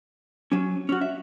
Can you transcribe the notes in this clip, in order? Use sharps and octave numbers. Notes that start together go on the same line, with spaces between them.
F#3 C#4
C#4 F#4
E5